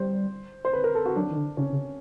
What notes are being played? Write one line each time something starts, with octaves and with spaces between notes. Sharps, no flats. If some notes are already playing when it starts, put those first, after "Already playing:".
Already playing: G3 C5
C5
B4
A#4
A4
F#4
F#3 D4
D#3
D3
C#3 C#4
C#3